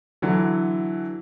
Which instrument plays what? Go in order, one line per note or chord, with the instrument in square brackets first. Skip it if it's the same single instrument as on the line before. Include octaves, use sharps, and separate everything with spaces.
[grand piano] D3 E3 F#3